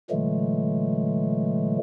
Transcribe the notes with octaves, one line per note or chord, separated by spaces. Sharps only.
A#2 D3 E3 F#3 G#3 A3